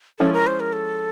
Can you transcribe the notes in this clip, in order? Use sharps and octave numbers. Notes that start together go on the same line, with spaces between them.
F3 G#3 C#4 E4 A4
A#4
C5
A#4
A4